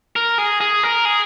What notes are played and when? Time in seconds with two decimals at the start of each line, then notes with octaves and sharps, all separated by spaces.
0.16 A#4
0.38 G#4
0.61 G#4
0.83 A#4
1.05 G#4